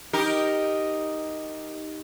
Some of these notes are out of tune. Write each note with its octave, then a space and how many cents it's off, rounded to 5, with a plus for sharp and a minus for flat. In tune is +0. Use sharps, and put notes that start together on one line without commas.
D#4 +0 G4 +0 A#4 +0